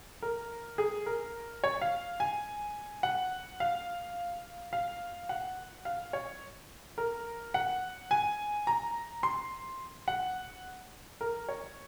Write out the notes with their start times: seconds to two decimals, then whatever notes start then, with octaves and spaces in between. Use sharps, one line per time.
0.22 A#4
0.78 G#4
1.06 A#4
1.64 C#5
1.82 F5
2.20 G#5
3.03 F#5
3.60 F5
4.73 F5
5.29 F#5
5.85 F5
6.13 C#5
6.98 A#4
7.54 F#5
8.11 G#5
8.67 A#5
9.23 C6
10.08 F#5
11.21 A#4
11.49 C#5